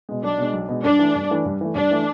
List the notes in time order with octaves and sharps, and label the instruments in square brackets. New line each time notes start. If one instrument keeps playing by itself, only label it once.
[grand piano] B2 G#3
[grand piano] B1 [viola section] D4
[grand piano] B2 G#3
B1
B2 G#3
[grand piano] G2 [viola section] D4
[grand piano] E3 A3
G2
E3 A3
G2
E3 A3
[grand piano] G2 [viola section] D4
[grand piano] E3 A3